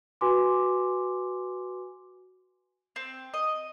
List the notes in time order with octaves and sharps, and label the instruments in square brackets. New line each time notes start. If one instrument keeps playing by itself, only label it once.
[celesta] F#4 B4 G#5 C6 D6
[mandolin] C4
D#5